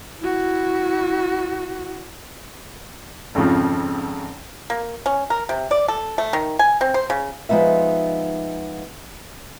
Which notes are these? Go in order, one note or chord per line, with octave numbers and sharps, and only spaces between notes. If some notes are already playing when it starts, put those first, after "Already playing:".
E4 F#4
G#1 F2 C#3 F3
A#3
C#4
A#4
C3
D5
A4
A3
D#3
G#5
C4
C5
C#3
F3 G#3 B3 D#4 E5